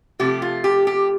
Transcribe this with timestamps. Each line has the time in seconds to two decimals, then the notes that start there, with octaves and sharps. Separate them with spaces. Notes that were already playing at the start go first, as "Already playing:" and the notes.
0.19 C3 F3 A3 G4
0.42 F4
0.64 G4
0.87 G4